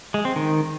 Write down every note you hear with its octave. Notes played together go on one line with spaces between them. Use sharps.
G#3
C4
D#3